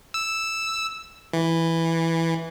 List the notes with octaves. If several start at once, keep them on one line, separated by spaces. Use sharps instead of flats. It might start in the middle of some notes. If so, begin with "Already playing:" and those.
E6
E3